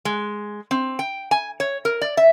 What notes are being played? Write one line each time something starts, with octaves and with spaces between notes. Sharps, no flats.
G#3
C4
G5
G#5
C#5
A#4
D5
E5